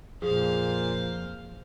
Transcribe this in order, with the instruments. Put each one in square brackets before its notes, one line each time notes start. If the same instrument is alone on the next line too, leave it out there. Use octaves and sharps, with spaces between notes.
[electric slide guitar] F2 F3 [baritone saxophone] A#2 [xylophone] G#4 [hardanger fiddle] C5 F5